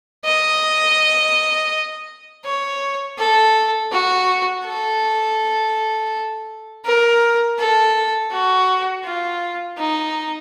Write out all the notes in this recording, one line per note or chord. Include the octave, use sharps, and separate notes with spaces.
D#5
C#5
A4
F#4
A4
A#4
A4
F#4
F4
D#4